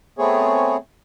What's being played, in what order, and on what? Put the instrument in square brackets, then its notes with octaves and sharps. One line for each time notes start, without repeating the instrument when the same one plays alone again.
[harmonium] A3 B3 C4 G#4 C#5